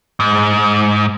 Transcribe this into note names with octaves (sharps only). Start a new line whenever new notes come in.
G#2